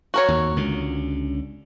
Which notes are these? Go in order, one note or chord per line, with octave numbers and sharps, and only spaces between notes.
F#4 A#4 C#5
D#2
C#2 D3